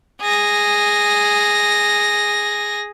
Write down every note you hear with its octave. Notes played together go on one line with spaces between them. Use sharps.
G#4 A#6